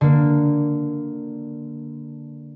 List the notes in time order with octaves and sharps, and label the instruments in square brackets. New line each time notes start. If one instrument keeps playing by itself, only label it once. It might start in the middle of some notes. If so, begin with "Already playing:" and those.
[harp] D3 A#3